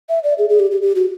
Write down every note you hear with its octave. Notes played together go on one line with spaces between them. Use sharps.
E5
D5
G#4
G#4
G4
G4
G4
F#4